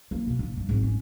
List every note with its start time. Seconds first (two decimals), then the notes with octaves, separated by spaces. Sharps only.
0.11 A#3
0.27 B2
0.39 D3
0.57 G2
0.69 G#1
0.83 C#4